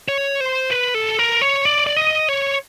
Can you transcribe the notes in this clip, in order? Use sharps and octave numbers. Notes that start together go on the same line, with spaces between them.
C#5
C5
B4
A4
A#4
C#5
D5
D5
D#5
C#5